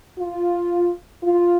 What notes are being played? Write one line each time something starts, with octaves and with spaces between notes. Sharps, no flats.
F4
F4